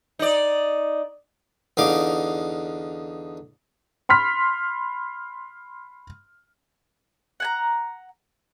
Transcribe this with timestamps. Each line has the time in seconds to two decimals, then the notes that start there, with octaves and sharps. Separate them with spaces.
0.19 D#4 D5
1.77 E2 D3 D#4 F5 D6
4.09 B5 C6 F6 B6
7.40 F#5 G#5 A#5